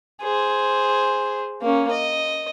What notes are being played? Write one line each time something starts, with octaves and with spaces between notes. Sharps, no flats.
G#4 C5
A#3 C#4
D#5